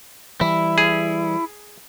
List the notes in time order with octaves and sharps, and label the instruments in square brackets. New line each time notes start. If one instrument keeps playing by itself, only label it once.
[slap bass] E3 G3 [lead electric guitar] E4
[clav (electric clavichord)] G#4